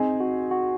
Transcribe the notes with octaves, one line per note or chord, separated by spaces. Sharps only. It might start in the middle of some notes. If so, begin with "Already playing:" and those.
Already playing: C4 D#4 G#4
F#4
F#4